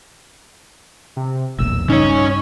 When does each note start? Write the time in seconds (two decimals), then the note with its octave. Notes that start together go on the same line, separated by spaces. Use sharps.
1.16 C3
1.58 E1 B1 A#2 E6
1.89 G2 C#3 C#4 D#4 C#5